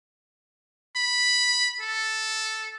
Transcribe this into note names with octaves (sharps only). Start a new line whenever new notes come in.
B5
A4